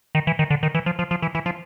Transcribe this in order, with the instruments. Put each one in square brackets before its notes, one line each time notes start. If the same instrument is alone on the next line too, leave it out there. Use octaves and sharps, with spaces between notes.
[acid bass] D#3
E3
D#3
D3
D#3
E3
F3
F3
F3
E3
E3
F3